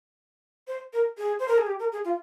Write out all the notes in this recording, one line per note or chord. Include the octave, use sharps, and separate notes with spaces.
C5
A#4
G#4
C5
A#4
G#4
G4
A#4
G#4
F4